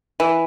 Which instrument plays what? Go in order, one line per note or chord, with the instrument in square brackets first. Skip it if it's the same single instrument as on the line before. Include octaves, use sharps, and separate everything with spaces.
[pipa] E3